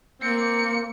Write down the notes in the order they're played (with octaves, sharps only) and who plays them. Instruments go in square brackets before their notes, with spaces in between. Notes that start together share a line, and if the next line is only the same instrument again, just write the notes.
[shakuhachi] A#3 [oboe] C4 [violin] C#7